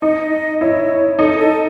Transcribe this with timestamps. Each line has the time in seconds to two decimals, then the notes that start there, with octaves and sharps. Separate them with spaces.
0.02 D#4 D#5
0.61 E4 C#5
1.19 D#4 A4
1.39 A4